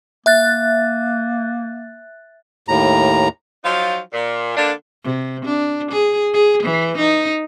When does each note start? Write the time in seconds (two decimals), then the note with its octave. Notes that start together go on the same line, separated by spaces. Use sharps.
0.26 A#3 E5 F#6 A6
2.68 D#2 A2 A#5
3.64 F3 F#3 D#4 F4
4.13 A#2
4.57 D3 A#3 D4
5.04 C3
5.45 D4
5.91 G#4
6.34 G#4
6.63 E3
6.97 D#4